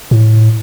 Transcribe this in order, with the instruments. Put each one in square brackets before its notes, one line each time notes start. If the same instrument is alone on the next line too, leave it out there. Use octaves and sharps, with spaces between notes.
[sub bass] A2